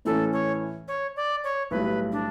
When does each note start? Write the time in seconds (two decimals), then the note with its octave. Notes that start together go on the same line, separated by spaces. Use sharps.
0.05 A2 E3 A3 C#4 A4
0.33 C#5
0.88 C#5
1.16 D5
1.44 C#5
1.71 B1 A2 G3 B4
2.12 D4